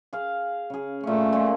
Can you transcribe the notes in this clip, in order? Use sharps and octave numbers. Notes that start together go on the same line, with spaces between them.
G#4 F5
C#3 G#4
A#2 A3 C#4
A#2 G#3 A4